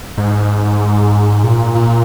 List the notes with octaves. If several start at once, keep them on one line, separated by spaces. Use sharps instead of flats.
G#2
A#2
A#2